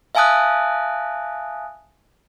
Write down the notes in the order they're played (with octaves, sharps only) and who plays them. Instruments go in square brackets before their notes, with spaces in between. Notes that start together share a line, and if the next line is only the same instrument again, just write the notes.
[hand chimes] E5 F5 G#5 A5 D#6 F#6